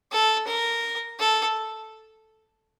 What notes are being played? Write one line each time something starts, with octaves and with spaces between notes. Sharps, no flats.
A4
A#4
A4